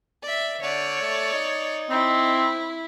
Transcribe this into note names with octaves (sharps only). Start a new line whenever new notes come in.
D5 E5
D3 C#5 D5
A3
D#4
C4 E4